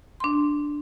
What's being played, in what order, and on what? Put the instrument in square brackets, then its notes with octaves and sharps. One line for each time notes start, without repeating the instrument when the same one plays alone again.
[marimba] D4 C6